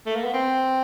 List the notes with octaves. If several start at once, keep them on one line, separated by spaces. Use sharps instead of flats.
A3
A#3
B3
C4